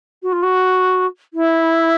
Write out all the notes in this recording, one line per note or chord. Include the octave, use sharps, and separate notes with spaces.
F#4
F4
F#4
E4